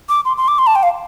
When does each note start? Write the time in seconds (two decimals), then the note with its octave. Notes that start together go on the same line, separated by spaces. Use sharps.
0.09 D6
0.25 C6
0.37 C6
0.48 D6
0.59 C6
0.67 A5
0.75 G5
0.83 F5